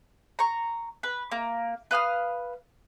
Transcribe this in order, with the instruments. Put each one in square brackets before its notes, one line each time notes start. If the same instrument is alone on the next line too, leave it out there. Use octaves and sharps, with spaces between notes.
[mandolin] A#5 C#6
B4
A#3
B4 F5 D#6 F6